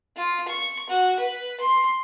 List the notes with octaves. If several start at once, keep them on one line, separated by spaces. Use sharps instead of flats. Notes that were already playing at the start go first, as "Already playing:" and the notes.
F4
C#6
F#4
B4
C6